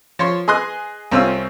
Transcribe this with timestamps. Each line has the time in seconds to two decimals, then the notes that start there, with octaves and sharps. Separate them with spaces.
0.19 F3 C#5 C6
0.48 G#4 D#5 C6 D#6 F#6
1.12 C2 C4 C#4 F4 G#5 E6